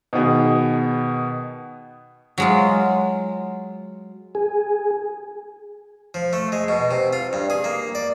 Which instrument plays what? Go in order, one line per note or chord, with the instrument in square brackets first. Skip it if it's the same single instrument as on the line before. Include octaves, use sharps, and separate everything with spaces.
[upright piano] B2 D#3 B3 G#4
[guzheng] F#3 G#3 F4
[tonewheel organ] G#4
[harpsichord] F3
A3
G#3
B2
C3
F4
G2
G#4
A#3
D5